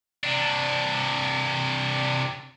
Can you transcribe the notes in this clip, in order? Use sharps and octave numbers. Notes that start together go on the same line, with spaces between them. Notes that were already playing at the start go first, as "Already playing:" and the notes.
C3 D4